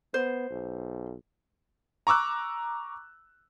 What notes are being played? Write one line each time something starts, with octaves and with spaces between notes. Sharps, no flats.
B3 C5
B1
A#5 C#6 D6 E6 F#6